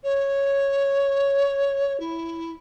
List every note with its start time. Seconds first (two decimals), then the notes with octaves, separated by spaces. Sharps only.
0.04 C#5
2.00 E4